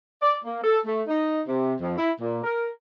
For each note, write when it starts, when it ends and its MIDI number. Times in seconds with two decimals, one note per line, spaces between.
0.22 0.36 74
0.45 0.61 58
0.64 0.79 69
0.86 1.02 57
1.08 1.40 63
1.47 1.73 48
1.81 1.94 41
1.97 2.11 64
2.21 2.41 46
2.44 2.68 70